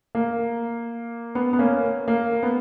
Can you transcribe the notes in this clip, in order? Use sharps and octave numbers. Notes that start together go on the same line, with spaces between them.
A#3
B3
B3
A#3 C#4
A#3
B3